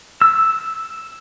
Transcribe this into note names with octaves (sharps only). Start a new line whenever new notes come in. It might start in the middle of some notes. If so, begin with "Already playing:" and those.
E6